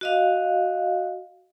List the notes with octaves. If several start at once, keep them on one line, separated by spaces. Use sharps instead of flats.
F#4 D#5 F5